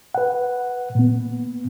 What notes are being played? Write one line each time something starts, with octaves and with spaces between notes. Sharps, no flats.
B4 F#5
A#2 B3